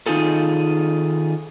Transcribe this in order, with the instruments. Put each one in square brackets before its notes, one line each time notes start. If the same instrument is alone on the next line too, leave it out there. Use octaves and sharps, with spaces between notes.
[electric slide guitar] D#3 D#4 F4 G#4 A4